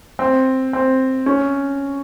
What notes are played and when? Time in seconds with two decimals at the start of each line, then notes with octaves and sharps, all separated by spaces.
0.19 C4
0.73 C4
1.26 C#4